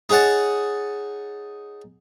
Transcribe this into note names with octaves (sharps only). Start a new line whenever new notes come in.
D#4 G#4 C#5 F#5 A5